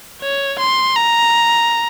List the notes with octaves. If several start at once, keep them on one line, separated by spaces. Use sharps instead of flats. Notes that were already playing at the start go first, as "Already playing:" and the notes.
C#5
C6
A#5